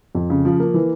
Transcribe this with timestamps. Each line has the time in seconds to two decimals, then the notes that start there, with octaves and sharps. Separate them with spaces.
0.15 F2
0.30 C#3
0.45 F3
0.60 A#3
0.74 E3